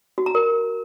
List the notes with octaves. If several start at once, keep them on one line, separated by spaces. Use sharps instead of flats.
F#4
A#5
A#4